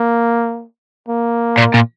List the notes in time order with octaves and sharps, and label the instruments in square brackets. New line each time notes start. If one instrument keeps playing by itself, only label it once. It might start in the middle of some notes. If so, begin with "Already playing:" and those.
Already playing: [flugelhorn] A#3
A#3
[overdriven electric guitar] A#2
A#2